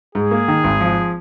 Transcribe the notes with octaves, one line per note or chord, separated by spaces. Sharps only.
G#2 G#4
A#3
D#3
G#1
F3